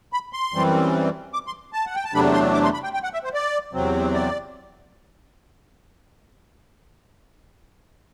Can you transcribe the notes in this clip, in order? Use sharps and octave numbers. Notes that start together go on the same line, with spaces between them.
B5
C6
F#2 E3 G3 C4
D6
C6
A5
F#5
G5
A5
E2 C3 F#3 A3 D4 B5
C6
D6
C6
B5
G5
G5
F#5
E5
C5
D5
E2 C3 F#3 C4
D5